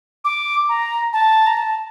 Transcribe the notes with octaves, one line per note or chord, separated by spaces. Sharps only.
D6
A#5
A5
A#5
A5